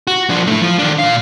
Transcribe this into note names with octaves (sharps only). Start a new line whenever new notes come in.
F#4
F3 D4
A3 E4
F3
D#3 D4
A#2 F5